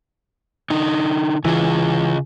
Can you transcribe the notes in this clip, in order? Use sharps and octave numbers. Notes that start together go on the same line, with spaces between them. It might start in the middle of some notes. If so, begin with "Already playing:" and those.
D3 D#4
C#3 E3 F4 G#4